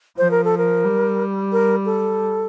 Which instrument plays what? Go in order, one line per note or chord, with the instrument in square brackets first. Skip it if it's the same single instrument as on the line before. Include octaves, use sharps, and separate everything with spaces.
[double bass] F3 [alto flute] C5
[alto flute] A#4
A4
A#4
[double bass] G3
[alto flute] A#4
A4